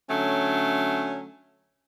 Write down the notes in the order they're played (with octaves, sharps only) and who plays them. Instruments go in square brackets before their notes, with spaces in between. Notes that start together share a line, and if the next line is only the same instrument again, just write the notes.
[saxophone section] D3 F#3 A3 C#4